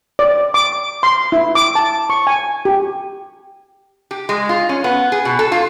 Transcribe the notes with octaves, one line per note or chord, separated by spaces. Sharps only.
D5
D6
C6
E4
D6
A5
C#6
G#5
G4
G4
G#3
F4
C#4
B3
G#4
B2
A4
F4